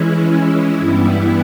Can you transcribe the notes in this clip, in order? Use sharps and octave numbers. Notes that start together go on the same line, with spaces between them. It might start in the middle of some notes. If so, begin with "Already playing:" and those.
Already playing: E3 G#3 C#4 E4
G2 E3 G3 B3 E4